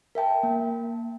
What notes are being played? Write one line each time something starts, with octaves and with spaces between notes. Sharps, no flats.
A#4 E5 G5 A5
A#3